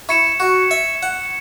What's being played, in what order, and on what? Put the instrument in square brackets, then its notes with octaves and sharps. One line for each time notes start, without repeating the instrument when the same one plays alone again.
[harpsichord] E4 [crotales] C#6 G#6 C#7 E7
[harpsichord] F#4
E5
F#5